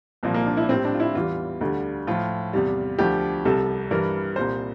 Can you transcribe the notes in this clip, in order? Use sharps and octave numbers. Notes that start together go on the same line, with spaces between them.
C2 A#2 F3 A#3
A#3
D4
E4
A2 G3 C4
D4
F4
E4
E2 E3 G3 F4
D2 D3 G3
A2 F3 F4
E2 C3 G3
D2 D3 F3 G4
C2 C3 G3 A4
G2 E3 G3 A#4
C2 A#2 G3 C5